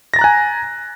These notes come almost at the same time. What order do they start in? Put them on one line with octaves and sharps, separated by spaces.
A#6 A6 A#5 F#6 G#5